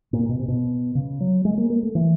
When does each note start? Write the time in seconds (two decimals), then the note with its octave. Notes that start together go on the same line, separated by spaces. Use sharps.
0.13 A#2
0.29 B2
0.39 C3
0.48 B2
0.95 C#3
1.21 F#3
1.45 G#3
1.58 A#3
1.70 A#3
1.83 A3
1.95 E3